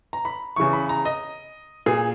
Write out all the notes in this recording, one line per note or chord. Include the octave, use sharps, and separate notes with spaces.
A#5
B5
E2 C#3 E3 C#6
B5
A#5
D#5
A#2 G#4